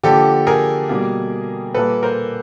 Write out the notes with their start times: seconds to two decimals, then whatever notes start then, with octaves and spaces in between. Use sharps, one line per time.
0.04 D3 F3 A#3 G4 A4
0.47 G#4 A#4
0.89 B2 G3 A#3
1.74 A#2 G3 A#3 A4 B4
2.03 A#4 C5